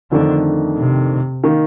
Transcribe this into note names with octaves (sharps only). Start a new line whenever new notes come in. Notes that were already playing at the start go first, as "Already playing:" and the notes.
F2 D3 D#3 A3 D4
C3
D#3 A#3